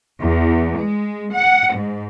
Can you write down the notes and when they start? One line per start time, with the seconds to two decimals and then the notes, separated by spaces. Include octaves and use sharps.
0.19 E2
0.76 G#3
1.32 F#5
1.74 G#2